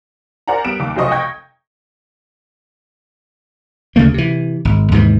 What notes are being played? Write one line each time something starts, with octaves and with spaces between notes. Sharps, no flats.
A#4 C5 D5 F#5 G#5 A#5
G3 B3 D7 E7
D#2 D6
F1 B1 F#3 C5 D#5 C#6
G5 C#6 D#6 G6 G#6 A#6
D2 C#3 A3 A#3
C3 E3
G#1
D#2 G#2 C3 E3